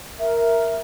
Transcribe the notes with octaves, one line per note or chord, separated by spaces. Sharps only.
A#4 E5